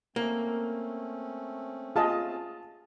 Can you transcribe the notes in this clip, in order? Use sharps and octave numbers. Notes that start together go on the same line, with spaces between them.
A3 A#3 C4 C#4
F4 G#4 D#5 A5